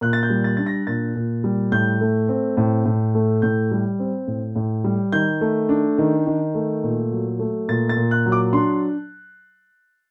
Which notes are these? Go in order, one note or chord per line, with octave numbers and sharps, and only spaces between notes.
A#2 F#6
A6
G6
G3
A6
D4 A6
A#6
A#2 A6
A#2
G3
A2 G6
A3
C4
A2
A2
A3
A2 G6
G3
C4
A2
A2
G3
D#3 G6
A3
D4
D#3
D#3
A3
A#2
F#3
A3
A#2 A6
A6
A#2
F#6
F#3
D6
D4 C6